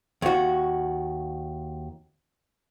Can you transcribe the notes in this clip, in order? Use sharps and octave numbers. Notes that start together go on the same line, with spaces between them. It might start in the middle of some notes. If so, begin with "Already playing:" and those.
D#2 F#4